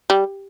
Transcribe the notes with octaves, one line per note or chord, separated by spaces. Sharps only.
G3